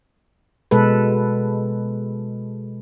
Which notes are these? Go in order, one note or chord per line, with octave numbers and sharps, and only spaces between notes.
B2 G#3 A4 B4